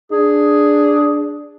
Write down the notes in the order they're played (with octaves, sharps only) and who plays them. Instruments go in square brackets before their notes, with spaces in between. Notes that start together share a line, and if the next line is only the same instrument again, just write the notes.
[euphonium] D4 [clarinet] G#4